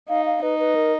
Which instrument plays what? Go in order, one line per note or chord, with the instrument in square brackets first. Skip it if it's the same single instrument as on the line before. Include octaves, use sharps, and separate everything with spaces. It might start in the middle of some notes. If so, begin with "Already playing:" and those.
[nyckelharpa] D#4 [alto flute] F5
[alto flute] F5
[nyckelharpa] D#4 [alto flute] B4
[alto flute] B4
A#4